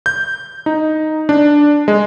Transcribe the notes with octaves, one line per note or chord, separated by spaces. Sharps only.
G6
D#4
D4
G#3